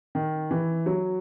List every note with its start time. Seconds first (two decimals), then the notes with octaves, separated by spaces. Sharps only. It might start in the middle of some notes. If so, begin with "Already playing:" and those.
0.15 D#3
0.51 E3
0.86 F#3